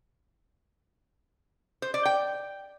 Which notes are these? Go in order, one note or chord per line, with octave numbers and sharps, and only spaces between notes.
C5
D5
G5